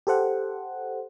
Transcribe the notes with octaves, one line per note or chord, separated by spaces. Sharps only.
G4 A4 C5 F#5